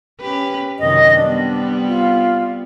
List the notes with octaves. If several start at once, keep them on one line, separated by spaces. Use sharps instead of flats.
C#4 G4 B4
F#2 C3 D#3 D#5
G3 B3 C4 D4
F4